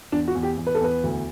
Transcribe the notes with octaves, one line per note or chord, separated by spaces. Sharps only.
E2 D4
F#4
E2
G4
E2
B4
A4
E2 B4
D2